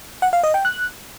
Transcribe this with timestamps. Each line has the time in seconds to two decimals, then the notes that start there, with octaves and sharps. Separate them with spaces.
0.22 F#5
0.33 F5
0.43 D#5
0.54 G5
0.65 F#6